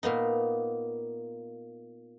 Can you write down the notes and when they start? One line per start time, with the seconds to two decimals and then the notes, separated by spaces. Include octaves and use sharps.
0.03 A#2 A#3 B3 D#4